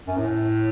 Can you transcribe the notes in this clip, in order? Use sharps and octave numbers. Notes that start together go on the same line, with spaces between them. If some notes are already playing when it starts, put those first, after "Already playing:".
F#2
A2